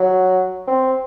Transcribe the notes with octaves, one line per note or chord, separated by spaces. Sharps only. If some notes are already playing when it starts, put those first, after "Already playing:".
Already playing: F#3
C4